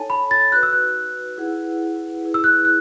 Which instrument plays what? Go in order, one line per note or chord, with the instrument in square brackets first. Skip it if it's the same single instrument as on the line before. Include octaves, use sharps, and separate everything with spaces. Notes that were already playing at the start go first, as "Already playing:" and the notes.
Already playing: [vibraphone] D#4 A4 C#5 [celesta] G#5 A5
[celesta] B5
A6
[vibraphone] D#4 F#4 B4 [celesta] F#6
[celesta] E6
F#6
[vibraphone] E4 G#4 B4 F#5
E4 G#4 B4
[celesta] E6
F#6
F#6